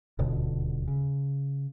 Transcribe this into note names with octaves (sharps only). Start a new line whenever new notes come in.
D#1 D2 B2 D3
C#3